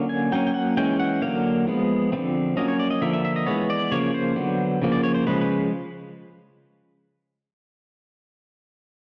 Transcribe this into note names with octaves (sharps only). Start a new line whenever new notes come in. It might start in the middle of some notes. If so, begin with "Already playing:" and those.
Already playing: D3 F#3 A#3 C#4
G#5
F#3 A#3 C#4 G5
G5
F#5
E3 G#3 C#4 G5
F#5
D3 F#3 A#3 F5
F3 G#3 B3
D3 F3 A3 C4
F#3 A#3 C#4 D#5
C#5
D5
D#5
D3 F3 A#3 E5
E5
E5
D#5
E3 G#3 B3 C#5
D5
C#3 F3 A#3 C#5
C5
D3 F#3 B3
C#3 F3 A#3
D5
C#5
C5
C#3 F3 G#3 B4
B4